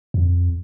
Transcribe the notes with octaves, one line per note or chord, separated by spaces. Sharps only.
F2